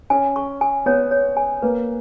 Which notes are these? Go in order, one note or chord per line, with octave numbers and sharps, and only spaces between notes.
C#4 G#5
C#6
G#5
B3 C#5
C#5
G#5
A#3 B4